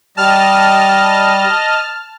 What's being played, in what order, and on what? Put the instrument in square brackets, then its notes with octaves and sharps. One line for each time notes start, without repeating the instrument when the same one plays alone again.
[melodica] G3 [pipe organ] D#5 [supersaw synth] A5 F6